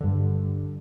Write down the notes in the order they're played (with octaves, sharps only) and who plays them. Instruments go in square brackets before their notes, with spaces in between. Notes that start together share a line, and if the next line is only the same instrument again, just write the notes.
[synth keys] G2 D3